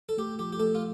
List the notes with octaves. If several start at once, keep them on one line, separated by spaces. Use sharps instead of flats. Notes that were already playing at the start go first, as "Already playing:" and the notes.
A4
A3 G4
F3 G4
G4
A3 A4
F4